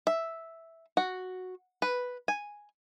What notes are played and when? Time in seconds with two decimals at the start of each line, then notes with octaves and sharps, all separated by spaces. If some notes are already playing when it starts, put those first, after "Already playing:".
0.07 E5
0.97 F#4
1.82 B4
2.28 G#5